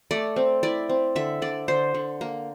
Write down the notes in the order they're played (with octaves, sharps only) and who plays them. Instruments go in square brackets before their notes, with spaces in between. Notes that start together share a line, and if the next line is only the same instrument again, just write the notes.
[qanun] A3 D5
C4
E4 D5
C4
D3 E5
D3 D5
D3 C5
D3
A#3